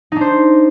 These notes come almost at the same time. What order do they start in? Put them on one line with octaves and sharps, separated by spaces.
D#4 D4 C5